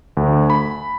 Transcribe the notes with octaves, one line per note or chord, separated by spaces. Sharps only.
D2
B5